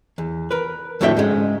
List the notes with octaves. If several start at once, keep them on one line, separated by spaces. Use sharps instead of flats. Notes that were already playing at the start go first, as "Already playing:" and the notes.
E2
A#4 B4
F2 A2 D3 F#4 E5 G5
G#2 C#3 G#3